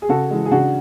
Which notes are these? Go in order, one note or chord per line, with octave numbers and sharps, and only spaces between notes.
G#4
C#3 F#4 A4
E3 G#3
G#4
C#3 D4 F#4